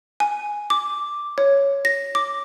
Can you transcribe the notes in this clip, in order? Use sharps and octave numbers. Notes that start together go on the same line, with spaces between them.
G#5
D6
C#5
A#6
D6